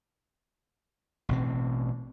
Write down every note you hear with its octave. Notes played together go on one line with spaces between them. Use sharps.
A1 B2 C4